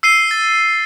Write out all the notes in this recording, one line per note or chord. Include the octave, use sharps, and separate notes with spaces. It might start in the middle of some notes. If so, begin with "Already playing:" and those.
E6 C7 D#7 G7
A6